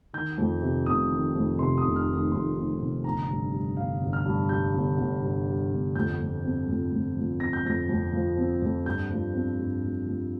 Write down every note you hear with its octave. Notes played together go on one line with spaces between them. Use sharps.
D#3 G6
F2
C3
F1 D#6
D#3
F2
C3 C6
D#6
F1
F6
D#3
D#6
F2 C6
C3
F1
G1 A#5
G2
G3
G1 F5
G1
F6
G2
G3 G6
G1
G1
G2
G3
G1
F2 G6
F3
C4
F2
F2
F3
C4 A#6
G6
F2 A#6
F2
F3
C4
F2
G2 G6
F3
C4
G2
G2
F3